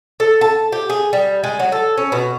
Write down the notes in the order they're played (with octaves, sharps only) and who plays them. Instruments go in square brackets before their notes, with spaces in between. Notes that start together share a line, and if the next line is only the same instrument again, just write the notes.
[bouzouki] A4
A5
G4
G#4
G3
G#3
F#3
A4
C#4
B2